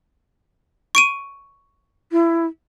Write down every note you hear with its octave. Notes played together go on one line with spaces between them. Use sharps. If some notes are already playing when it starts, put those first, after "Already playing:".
C#6 D7 D#7
E4